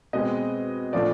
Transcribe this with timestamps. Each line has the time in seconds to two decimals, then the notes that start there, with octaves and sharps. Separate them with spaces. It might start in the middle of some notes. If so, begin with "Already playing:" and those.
0.13 B2 G#3 C4 D#5
0.93 A#2 F3 A3 D4 F4 D5